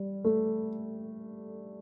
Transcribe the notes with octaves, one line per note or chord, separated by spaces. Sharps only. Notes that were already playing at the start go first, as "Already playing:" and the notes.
Already playing: G3
A3